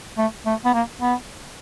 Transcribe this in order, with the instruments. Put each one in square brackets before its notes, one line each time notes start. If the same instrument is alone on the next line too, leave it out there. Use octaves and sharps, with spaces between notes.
[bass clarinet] A3
A3
B3
A#3
B3